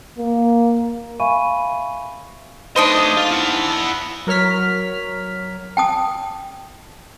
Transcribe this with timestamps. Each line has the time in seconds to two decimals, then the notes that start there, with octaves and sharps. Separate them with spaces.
0.19 A#3
1.20 E5 F5 G#5 B5 C#6 D#7
2.76 A3 D4 D#4 C5 D#5
3.17 F4
3.31 E4 F#5
4.27 F#3 A#4 C#5 F6 B6
5.77 G5 A5 D#6